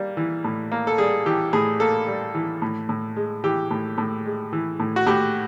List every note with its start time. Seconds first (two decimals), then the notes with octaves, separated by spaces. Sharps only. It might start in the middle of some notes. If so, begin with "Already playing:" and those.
Already playing: G3 A#3
0.17 E3
0.44 A2
0.72 A#3
0.87 A4
0.98 G3 G#4
1.26 E3 G4
1.53 A2 G#4
1.80 A#3 A4
2.08 G3
2.35 E3
2.62 A2
2.89 A2
3.16 G#3
3.44 E3 G4
3.71 A2
3.98 A2
4.26 G#3
4.53 E3
4.80 A2
4.96 F#4
5.07 A2 G4